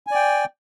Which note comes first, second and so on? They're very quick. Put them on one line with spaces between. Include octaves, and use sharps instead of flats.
G#5 D5 G5